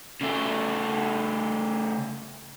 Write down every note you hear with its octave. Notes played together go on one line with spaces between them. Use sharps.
C#3 A3